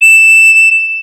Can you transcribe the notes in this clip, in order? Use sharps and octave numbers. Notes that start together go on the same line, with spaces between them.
E7